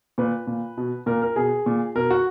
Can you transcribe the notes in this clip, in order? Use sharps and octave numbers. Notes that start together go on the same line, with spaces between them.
A#2 B4
A#2
B2
A#2 A#4
A#4
B2 G#4
A#2
B2 A#4
F#4